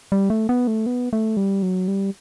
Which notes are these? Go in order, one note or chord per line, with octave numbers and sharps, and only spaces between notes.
G3
A3
B3
A3
B3
A3
G3
F#3
G3